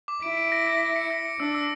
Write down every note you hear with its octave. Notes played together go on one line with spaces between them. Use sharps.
D6
E4 D7
D7
A#6
A#6
A#6
C#7
A#6
C#7
D4 E6
E6